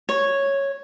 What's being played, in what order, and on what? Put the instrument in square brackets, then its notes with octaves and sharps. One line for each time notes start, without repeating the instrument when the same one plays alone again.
[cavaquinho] C#5